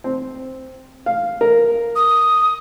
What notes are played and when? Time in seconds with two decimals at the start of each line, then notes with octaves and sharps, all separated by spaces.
0.04 C4
1.06 F5
1.41 A#4
1.96 D#6